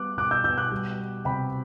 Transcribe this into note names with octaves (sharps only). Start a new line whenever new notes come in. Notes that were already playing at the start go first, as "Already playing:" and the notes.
Already playing: G3 B3 D6 F#6
B2 D6 F#6
E6 G6
B2 E6 G6
D6 F#6
G3
B3
C3 G5 B5